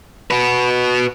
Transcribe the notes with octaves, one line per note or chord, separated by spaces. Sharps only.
F#4 B4